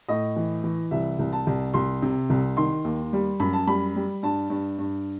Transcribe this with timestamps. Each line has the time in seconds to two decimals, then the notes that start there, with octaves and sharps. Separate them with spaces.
0.08 A2 D#5
0.36 E3
0.64 E3
0.91 C2 E5
1.19 C2
1.33 A5
1.47 C2
1.74 C2 C6
2.02 C3
2.30 C2
2.57 D#3 C6
2.85 D#2
3.13 G3
3.40 F#2 B5
3.53 A5
3.67 G3 B5
3.96 G3
4.23 G2 A5
4.50 G2
4.79 G2